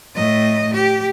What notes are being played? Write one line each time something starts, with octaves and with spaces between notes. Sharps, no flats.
A2 D#5
G4